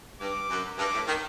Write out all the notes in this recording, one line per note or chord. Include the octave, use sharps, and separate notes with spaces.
G2 D6
F#2
G2 D6
A2
D#3